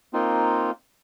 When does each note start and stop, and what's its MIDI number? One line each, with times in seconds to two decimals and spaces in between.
0.13 0.71 58
0.13 0.71 60
0.13 0.71 63
0.13 0.71 65